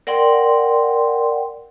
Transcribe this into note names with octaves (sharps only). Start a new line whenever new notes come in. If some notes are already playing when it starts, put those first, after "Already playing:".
A#4 D5 F#5 G5 C6